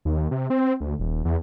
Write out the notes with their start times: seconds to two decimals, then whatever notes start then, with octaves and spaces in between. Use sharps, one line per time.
0.05 D#2
0.31 C3
0.50 C4
0.81 D2
0.99 D#1
1.25 E2